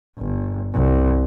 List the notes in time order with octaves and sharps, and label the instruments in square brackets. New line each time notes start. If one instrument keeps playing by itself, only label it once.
[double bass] G1
C2